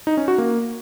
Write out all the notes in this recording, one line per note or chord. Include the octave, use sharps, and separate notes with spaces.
D#4
C#4
F#4
A#3